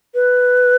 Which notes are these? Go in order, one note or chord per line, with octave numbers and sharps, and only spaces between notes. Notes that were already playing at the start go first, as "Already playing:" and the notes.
B4